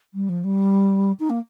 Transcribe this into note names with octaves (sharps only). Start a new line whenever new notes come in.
G3
F3
G3
D#4
A#3